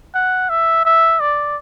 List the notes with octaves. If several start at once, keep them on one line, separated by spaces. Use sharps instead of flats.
F#5
E5
E5
D5